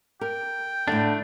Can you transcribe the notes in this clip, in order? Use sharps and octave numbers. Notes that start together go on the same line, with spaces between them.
A#4 G5
A2 D3 A3 D4